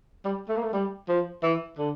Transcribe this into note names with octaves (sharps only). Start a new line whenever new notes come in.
G3
A3
A#3
A3
G3
F3
E3
D3